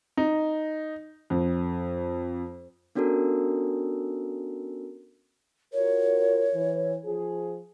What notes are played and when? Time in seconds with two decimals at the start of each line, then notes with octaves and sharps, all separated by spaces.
0.17 D#4
1.30 F2
2.95 B3 C#4 D4 F#4 A4 A#4
5.74 F4 F#4 A#4 C#5
6.54 E3
7.05 F3 G#4